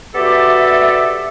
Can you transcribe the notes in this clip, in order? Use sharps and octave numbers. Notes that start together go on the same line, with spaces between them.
B3 F#4 G4 A4 D5 E5